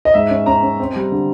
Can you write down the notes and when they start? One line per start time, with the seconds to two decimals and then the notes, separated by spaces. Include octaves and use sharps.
0.05 D#5
0.14 G#2 E5
0.31 C#4
0.46 C#4 A#5
0.63 C#4
0.80 C4
0.96 G3
1.12 D3